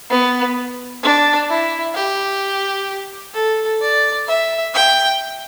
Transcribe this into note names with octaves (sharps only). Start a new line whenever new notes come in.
B3
D4
E4
G4
A4
D5
E5
G5